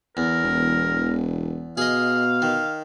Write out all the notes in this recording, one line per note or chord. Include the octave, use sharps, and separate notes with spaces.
E2 A#4
E1
B2 G#4 D#5 F5
D#3